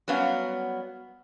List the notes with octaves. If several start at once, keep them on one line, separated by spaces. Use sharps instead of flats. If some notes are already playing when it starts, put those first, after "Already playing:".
F#3 G3 B3 C#4 F5